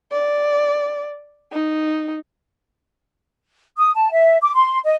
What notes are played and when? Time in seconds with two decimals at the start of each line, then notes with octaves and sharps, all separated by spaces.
0.12 D5
1.52 D#4
3.77 D#6
3.96 A5
4.11 E5
4.42 D6
4.55 C6
4.85 D#5